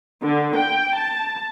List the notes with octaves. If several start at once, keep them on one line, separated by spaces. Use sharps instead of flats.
D3
G5
A5